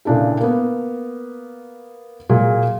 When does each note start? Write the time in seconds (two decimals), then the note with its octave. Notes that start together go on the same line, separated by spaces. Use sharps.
0.05 A#2 C#3 D4 E4 A4
0.41 A#3 B3
2.29 A#2 F#3 G#4